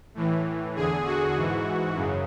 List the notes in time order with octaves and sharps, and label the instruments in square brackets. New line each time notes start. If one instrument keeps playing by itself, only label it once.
[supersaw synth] A2 E3
E2 D3 G#4
F#4
G#2 E3
F#2 C#3